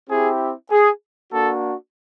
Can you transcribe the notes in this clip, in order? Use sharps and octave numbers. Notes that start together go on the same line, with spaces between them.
C4 E4 G4 G#4
G#4
A#3 D4 F#4 A4